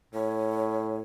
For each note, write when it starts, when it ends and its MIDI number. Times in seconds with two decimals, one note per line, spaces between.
0.15 1.01 45
0.15 1.00 73